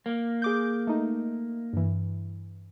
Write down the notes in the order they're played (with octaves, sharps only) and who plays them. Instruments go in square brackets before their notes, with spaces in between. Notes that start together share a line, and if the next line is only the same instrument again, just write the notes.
[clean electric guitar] A#3
[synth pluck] G#4 D6 G6
A3 D#4
G2 E3